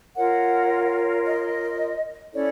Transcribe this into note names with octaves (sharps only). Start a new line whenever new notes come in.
F4 A#4 C#5 F#5
D#5
C#4 E4 A4 C#5 D5